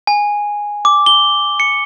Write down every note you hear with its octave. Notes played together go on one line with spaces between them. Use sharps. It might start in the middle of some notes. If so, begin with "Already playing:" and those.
G#5
D6
G7
C#7